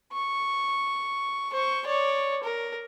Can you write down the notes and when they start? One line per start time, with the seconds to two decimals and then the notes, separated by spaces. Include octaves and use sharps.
0.13 C#6
1.52 C5 C#6
1.86 C#5 D5
2.43 A#4